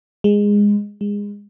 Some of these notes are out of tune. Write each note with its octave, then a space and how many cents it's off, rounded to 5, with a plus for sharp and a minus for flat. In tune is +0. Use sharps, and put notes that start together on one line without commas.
G#3 -15
G#3 -25